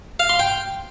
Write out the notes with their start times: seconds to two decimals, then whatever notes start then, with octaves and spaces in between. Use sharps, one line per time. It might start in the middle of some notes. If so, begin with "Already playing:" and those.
0.20 F5
0.29 C6
0.39 G5